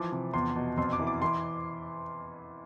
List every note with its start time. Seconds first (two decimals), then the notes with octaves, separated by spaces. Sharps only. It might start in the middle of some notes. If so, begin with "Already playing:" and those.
Already playing: E3 F3 D6
0.12 C3
0.33 E2 C6
0.56 B2
0.77 F2 C6
0.93 D6
1.00 E3
1.07 D6
1.22 E3 C6